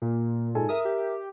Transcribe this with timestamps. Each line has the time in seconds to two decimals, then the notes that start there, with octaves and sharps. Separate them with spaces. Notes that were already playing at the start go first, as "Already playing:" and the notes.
0.02 A#2 A#3
0.55 G#2 A4 G#5
0.69 A#4 E5 D#6
0.85 G4